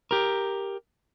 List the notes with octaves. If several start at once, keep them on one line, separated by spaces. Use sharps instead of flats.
G4 A#4